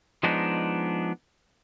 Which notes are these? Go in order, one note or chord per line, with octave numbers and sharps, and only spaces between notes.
F3 G#3 B3 D4 D#4